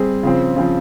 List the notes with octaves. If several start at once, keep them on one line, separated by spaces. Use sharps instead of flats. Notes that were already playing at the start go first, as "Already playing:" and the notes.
Already playing: G3 C4 G#4
C#3 F3 C4
C#3 F3 C4